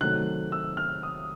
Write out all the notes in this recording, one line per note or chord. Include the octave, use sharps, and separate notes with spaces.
C3 D#3 F#3 A3 F#6
E6
F6
D#6